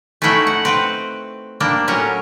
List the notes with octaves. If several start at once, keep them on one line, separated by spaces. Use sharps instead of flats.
A3 C#4 D#4 E4 F#4 G5
F#5
C4 B4 F#5
G3 A#3 D4
A2 F#3 C#4 A#4